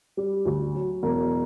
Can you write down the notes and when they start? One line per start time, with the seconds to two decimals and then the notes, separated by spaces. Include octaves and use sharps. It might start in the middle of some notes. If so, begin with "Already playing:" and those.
0.17 G3
0.45 D2
0.75 F#3
1.03 E1